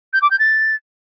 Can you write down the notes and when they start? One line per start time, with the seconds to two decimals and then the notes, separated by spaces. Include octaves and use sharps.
0.13 G6
0.22 D6
0.31 G6
0.39 A6